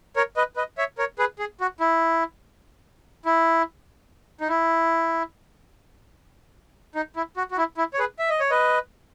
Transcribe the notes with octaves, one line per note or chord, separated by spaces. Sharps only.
A#4 C#5
B4 D#5
B4 D#5
C#5 E5
A#4 C#5
G#4 B4
G#4
F#4
E4
E4
D#4
E4
D#4
E4
F#4
F#4
E4
E4
C#5
G#4 B4
E5
D#5
C#5
B4 D#5